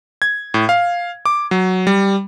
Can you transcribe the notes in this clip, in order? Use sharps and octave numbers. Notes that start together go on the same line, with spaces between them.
G#6
A2
F5
D6
F#3
G3